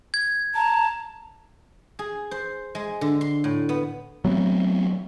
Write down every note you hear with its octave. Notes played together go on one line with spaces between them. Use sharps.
G#6
A5 A#5
G#4
C5
G#3
D3
C6
A2
B3
F#3 A3 B3 C4